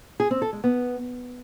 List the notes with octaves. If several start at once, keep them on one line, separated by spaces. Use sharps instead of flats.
G#4
C4
A4
G#3
B3